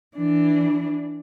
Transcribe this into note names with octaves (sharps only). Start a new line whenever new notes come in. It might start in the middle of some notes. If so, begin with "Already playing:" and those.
E3 D4